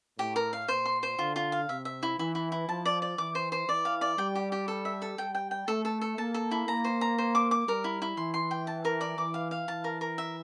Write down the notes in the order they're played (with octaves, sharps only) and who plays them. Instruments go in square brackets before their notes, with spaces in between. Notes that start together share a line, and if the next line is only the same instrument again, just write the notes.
[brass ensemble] A2 [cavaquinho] G4
[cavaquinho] A#4
F5
[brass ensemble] A#2 [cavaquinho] C5
[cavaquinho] C6
C5
[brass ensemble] D3 [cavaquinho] F4
[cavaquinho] F4
F5
[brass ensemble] C3 [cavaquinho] E5
[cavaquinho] E5
E4
[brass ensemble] E3 [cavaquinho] E4
[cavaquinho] E4
E4
[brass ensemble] F3 [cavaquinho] A5
[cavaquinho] D5
D5
[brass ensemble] E3 [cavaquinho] D6
[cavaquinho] C5
C5
[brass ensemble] E3 [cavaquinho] D5
[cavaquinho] F5
D5
[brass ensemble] G3 [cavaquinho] G5
[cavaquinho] G4
G4
A4
E5
A4
[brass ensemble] G3 [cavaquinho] G5
[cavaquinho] G5
G5
[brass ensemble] A3 [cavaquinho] A4
[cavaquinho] A4
A4
[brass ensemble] A#3 [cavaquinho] A5
[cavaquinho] A4
E4
[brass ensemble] A#3 [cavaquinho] A#5
[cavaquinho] C5
A#5
C5
D6
D6
[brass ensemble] G3 [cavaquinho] A#4
[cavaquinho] E4
E4
[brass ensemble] E3 [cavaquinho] C6
[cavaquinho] C6
G5
A5
A#4
D5
[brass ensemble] E3 [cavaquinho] D6
[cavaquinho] F5
F5
[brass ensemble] E3 [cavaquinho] A5
[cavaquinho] A#4
A#4
E5